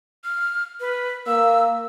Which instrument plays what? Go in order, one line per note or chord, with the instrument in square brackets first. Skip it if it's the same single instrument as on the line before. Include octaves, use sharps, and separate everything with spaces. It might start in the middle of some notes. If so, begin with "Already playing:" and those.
[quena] F6
B4
[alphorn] A#3 [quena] E6